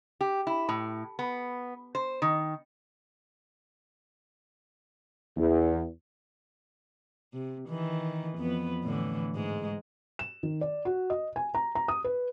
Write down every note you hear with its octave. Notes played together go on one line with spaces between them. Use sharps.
G4
E4
A2
B3
C5
D#3
E2
C3
D#3 E3
F2 B3 B4
A2 D3 E3
G#2 G#3
E7
D#3
D5
F#4
D#5
G#5
A#5
A#5
D#6
B4